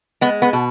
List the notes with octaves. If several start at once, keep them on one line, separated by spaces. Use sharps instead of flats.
G#3 B3
B3
B2